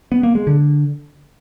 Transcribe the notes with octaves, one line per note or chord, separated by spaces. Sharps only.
B3
A#3
G#3
D3